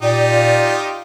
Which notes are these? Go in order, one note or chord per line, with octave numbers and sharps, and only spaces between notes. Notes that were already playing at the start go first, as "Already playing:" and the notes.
A#2 D#4 G4 D5
F4